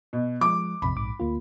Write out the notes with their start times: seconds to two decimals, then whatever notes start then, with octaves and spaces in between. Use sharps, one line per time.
0.13 B2
0.41 F3 G#3 D6
0.82 A#1 F2 C3 B5
0.96 A#1 G#2 D6
1.20 D2 A#3 F4